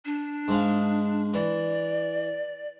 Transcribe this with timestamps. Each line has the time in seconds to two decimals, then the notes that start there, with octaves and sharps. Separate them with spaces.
0.05 D4
0.48 G#2 G#3 F5
1.34 E3 D5